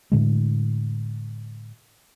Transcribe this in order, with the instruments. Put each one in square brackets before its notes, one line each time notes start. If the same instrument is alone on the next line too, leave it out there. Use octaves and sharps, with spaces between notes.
[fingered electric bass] A2 D3 G#3